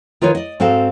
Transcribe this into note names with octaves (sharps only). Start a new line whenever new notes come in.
D#3 F4 A#4 B4 C#5
D5 D#5
G#2 C4 F#4 A4 F5